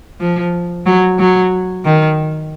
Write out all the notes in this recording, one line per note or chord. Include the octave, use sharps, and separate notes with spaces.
F3
F#3
F#3
D#3